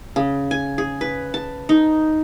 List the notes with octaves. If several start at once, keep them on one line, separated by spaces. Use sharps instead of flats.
C#3
G#5
G#4
B4
A5
D#4